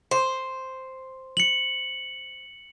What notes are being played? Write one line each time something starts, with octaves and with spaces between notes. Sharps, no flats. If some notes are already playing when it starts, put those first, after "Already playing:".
C5
C#7 F#7